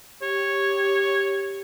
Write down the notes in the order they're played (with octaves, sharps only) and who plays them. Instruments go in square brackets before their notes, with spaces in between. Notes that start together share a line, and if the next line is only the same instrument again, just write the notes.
[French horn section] G4 [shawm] C#5